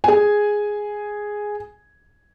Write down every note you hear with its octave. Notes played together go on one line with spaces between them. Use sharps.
G#4 G#5